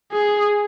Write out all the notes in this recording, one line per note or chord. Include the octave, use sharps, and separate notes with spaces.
G#4